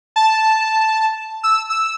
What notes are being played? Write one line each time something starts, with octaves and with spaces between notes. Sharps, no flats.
A5
E6
E6